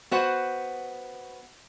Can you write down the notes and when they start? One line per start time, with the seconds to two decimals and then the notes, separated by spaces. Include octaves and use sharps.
0.11 B3 F#4 C5 F#5